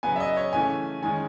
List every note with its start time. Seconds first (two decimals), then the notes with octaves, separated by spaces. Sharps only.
0.03 C#3 F#3 B3 G#5
0.16 E5
0.20 D#5
0.37 C#5
0.53 C#3 E3 A3 C#4 G#5
1.02 D#3 G#3 C#4 G#5